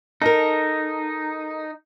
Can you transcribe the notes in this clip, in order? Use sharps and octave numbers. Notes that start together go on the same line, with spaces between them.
D#4 A4 A#4